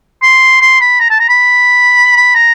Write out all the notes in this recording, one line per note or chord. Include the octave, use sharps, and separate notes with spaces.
C6
C6
B5
A#5
A5
A#5
B5
B5
A#5